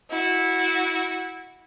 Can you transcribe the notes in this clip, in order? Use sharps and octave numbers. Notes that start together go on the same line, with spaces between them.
E4 F#4